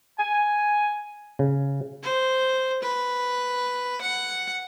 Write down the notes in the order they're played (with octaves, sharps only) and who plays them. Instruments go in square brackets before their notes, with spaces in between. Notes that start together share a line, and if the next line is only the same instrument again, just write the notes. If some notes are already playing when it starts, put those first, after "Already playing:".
[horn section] G#5
[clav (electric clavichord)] C#3
[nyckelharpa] C5
B4
F#5